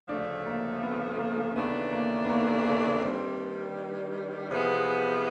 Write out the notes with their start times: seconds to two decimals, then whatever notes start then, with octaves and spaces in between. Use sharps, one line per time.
0.09 D2 C#3 F3 A3 D4
0.46 A#3
0.83 B3
1.19 A#3
1.55 D#2 C#3 E3 A3 B3 D4
1.92 A#3
2.24 B3
2.29 A#3
2.65 A#3
3.02 G2 D#3 G3 C4
4.49 E2 C3 F3 G#3 B3